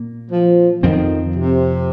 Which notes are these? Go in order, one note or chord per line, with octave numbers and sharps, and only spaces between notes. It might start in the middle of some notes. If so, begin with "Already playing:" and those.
Already playing: A#2 A#3
F3
F2 D#3 F3 C4
C3